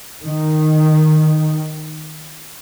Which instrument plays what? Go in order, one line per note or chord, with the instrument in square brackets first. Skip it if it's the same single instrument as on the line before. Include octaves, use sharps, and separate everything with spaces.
[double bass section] D#3